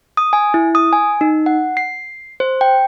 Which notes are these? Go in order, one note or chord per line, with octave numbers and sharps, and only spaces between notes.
D#6
G#5
E4
D#6
G#5
D#4
F#5
C7
C5
G5